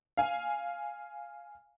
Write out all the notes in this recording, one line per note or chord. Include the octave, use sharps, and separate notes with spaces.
F5 G#5